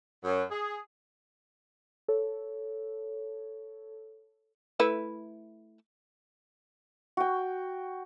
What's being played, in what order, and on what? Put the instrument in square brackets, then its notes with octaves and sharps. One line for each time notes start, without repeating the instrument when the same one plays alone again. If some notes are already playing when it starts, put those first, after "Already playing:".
[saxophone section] F#2
G#4
[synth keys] A4 C#5
[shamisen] A3 E4 B4
[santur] F#4 G5